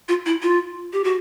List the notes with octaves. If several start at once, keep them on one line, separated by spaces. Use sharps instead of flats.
F4
E4
F4
G4
F#4